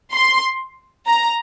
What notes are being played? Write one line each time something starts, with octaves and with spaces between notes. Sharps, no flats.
C6
A#5